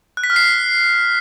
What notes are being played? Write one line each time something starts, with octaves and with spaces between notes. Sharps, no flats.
F#6
B6
F6
C7